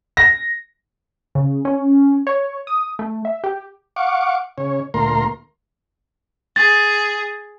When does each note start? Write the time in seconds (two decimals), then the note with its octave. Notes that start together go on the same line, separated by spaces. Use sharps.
0.17 A#6
1.35 C#3
1.65 C#4
2.27 C#5
2.67 D#6
2.99 A3
3.25 E5
3.44 G4
3.96 F5 F#5 C#6 D6
4.58 C#3 C#5
4.94 D2 A#2 A3 A#4 A#5 C6
6.56 G#4 A6